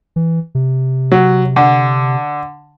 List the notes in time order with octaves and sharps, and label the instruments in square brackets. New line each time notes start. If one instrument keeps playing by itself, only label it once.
[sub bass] E3
C3
[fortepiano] F#3
D3